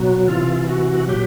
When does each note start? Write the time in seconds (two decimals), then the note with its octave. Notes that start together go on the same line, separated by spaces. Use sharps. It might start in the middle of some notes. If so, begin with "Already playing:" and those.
Already playing: B2 F#3
0.28 C3 E3 F4
0.69 F#4
1.08 A#2 F#3 G4